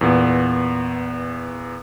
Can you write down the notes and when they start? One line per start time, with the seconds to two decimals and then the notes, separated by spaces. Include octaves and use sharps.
0.01 E2 A#2 B3